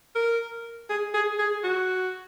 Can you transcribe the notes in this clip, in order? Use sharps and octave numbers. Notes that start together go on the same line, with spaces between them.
A#4
G#4
G#4
G#4
F#4